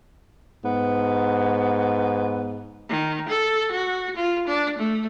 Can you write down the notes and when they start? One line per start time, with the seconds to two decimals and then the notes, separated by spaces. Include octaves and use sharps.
0.65 G#2 B3
2.89 D#3
3.28 A4
3.71 F#4
4.16 F4
4.47 D4
4.78 A3